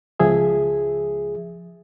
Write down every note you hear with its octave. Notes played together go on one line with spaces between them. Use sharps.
C#2 F3 G#4 E5